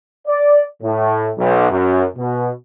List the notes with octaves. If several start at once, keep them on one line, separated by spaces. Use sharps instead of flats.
D5
A2
B1
F#2
B2